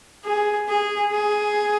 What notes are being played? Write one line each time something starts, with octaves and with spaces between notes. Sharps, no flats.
G#4
G#4
G#4